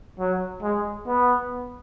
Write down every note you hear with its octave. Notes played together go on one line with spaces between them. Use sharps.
F#3
G#3
B3